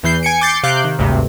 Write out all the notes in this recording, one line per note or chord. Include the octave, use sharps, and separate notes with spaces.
E2 E3 G6 C7
G#5 C#7 D7
D6 G6 A6 C7 C#7
C3 F5 D6 F#6 G6 C7
D#3
G#1 D2 G2 C3